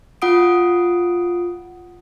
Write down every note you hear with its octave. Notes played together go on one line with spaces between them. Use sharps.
F4 F#5 D#6 D7